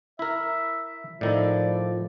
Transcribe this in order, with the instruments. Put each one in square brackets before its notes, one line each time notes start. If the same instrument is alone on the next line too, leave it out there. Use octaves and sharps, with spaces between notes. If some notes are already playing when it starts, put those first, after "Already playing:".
[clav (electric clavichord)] E4 A#4 [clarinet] E5
[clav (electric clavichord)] A2 D#3 E4 [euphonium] F3 [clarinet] D5